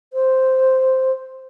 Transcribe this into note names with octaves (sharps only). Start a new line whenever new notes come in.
C5